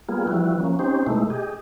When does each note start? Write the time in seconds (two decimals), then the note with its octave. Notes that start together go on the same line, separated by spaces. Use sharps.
0.09 G3 A#3 B3 F4 G#4
0.27 E3 F3 G3 E4 F#4
0.60 F3 A#3 C#4
0.79 C4 C#4 D#4 G4 C5
1.07 B2 G#3 A3 D#4 E4
1.30 G4 G#4 D#5